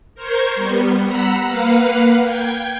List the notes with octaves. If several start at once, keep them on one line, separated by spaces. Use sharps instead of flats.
A#4 C5 C#6 G6 G#6
G3 B3
F#5 A#5 B5 E6
A#3 B4 F5 F#5
G5 G#6